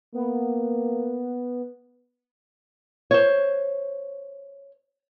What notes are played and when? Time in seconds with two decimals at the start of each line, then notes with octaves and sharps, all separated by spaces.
0.14 A#3 B3
3.11 C5 C#5